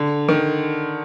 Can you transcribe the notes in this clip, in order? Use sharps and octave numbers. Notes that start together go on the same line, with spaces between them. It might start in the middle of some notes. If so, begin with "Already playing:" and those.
Already playing: D3
D#3